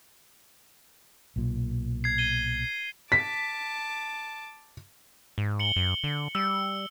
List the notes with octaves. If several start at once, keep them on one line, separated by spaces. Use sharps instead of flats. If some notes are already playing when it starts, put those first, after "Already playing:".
B1 A#2
G#6 C7
D#7 G7
A5 D6 B6
G#2
C#7 F#7 G7
F#2
D3
G3 E6